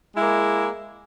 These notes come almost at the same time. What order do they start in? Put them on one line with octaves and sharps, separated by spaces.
G#3 E4 A#3